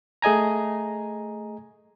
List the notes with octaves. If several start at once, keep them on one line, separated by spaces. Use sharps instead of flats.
A3 G#4 D#5 G#5 A#5